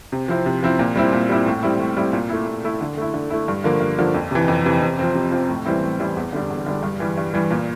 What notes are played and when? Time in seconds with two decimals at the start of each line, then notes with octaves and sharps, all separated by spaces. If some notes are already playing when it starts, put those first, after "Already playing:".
0.12 C3
0.28 F3 C4 E4
0.46 C3
0.63 F3 C4 E4
0.79 A#2
0.96 G3 C4 E4
1.13 A#2
1.29 G3 C4 E4
1.46 A2
1.63 G3 C4 E4
1.79 A2
1.97 G3 C4 E4
2.13 A#2
2.29 A3 E4
2.47 A#2
2.64 A3 E4
2.81 D3
2.97 A3 E4
3.14 D3
3.30 A3 E4
3.48 G2
3.64 D3 F3 A#3
3.81 G2
3.99 D3 F3 A#3
4.14 F2
4.31 C3 E3
4.48 F2
4.65 C3 E3
4.82 C3
4.99 F3 C4
5.15 C3
5.32 F3 C4
5.49 A2
5.65 E3 G3 C4 E4
5.82 A2
6.00 E3 G3 C4 E4
6.17 E2
6.33 D3 G3 D4
6.50 E2
6.66 D3 G3 D4
6.83 G2
7.00 E3 G3
7.18 G2
7.34 E3 G3
7.51 A#2